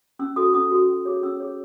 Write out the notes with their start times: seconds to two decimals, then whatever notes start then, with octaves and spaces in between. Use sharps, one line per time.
0.19 C#4 E6
0.36 F#4 A4 D#6
0.54 C#4 D#6
0.71 F#4 A4
0.89 C#4
1.05 G#4 C#5
1.23 C#4 E6
1.40 G#4 C#5